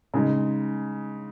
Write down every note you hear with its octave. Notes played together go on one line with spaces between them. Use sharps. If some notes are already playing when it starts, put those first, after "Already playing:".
C#3 G#3 D#4